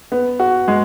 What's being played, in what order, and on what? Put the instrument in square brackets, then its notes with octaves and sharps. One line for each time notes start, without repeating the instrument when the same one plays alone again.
[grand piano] B3
F#4
G#3